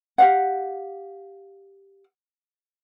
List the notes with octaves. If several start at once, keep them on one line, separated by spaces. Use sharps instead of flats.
G4 F5 F#5